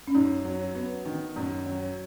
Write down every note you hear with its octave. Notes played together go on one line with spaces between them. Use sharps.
C#4
F#2 D#4
F#3
B3
D#3
F#2
F#3